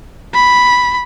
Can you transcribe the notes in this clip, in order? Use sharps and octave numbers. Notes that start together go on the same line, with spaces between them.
B5